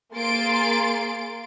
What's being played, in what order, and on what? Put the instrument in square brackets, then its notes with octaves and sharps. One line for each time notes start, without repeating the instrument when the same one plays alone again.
[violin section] A#3 G#4 C6 A6 D7